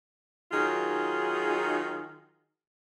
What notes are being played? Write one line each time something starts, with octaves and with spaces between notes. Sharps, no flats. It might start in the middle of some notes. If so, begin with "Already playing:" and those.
D#3 F#3 D#4 F4 G#4